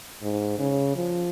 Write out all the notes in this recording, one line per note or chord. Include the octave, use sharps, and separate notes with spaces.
G#2
C#3
F3